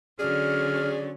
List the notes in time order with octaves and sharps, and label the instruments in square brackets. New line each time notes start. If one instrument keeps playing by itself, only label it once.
[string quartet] D3 F#3 C#4 [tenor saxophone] G#4 [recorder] D5 [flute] F6